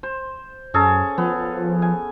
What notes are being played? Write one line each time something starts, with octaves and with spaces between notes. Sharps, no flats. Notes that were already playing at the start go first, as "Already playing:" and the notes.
C5
F#2 C#4 G#4 A4
F3 B3
G#5